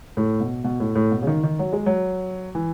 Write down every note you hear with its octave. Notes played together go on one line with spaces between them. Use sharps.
A2
B2
B2
A2
A2
B2
C#3
D#3
D#3
F#3
G#3
F#3
E3